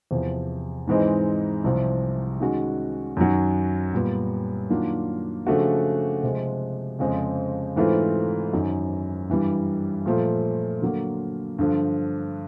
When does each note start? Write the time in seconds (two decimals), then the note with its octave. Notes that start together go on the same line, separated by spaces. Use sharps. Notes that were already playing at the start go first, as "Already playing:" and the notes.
0.11 E2 C3 F3
0.87 G#2 E3 G#3 C4 D#4
1.64 C2 C3 F3
2.40 D#3 G#3 C#4 F#4
3.17 F#2 D#3 F#3
3.94 A#2 G3 B3
4.70 D#3 F#3 A#3 D4 F4
5.47 C#3 F3 A3 D4 F#4
6.23 C3 F3 G#3
6.99 F2 C#3 F3 G#3 C4
7.76 G#2 E3 A3 C4 F4
8.53 F#2 D#3 F#3
9.29 G2 E3 G3
10.06 A#2 F3 A3
10.82 D3 F#3 A#3
11.59 G2 D3 F3